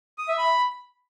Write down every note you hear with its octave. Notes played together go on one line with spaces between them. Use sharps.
D#6
E5
B5